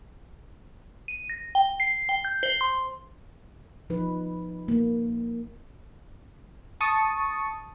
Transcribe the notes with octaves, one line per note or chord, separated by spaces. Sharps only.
D#7
A#6
G5
C7
G5
G6
C5
C6
F3 D#4 B4
A#3
A5 C#6 D#6